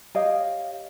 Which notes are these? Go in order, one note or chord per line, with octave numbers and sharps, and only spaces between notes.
G4 C#5 D#5 F5